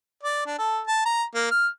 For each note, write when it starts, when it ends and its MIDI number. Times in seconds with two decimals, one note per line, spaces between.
0.23 0.43 74
0.46 0.54 62
0.59 0.80 69
0.87 1.03 81
1.06 1.23 82
1.35 1.46 58
1.51 1.67 89